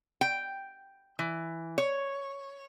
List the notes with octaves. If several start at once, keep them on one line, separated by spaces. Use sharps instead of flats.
G5
E3
C#5